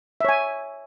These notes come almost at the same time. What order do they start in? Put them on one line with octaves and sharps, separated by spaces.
E5 C#5 G#5